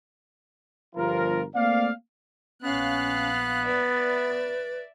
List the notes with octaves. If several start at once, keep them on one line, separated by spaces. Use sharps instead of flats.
G1 F3 F4 A#4
A3 A#3 C4 D5 F5
A#1 B3 C#4 F5 F#6
B4 D5 E5 A6